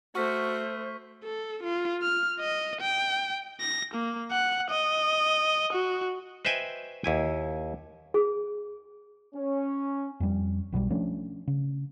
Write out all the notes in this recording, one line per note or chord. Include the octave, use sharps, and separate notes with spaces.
A3 F#4 C5 C#6 F6 B6
A4
F4
F6
D#5
G5
A#6
A#3
F#5
D#5
F#4
B4 C5 D#5 E5 G5 G#5
D#2 E4 G#5
G#4
C#4
F2 G3
B1 B2 F#3 G3
F3 A3 C#4 D4
C#3